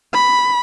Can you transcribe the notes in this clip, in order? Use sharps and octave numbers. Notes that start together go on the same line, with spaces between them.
B5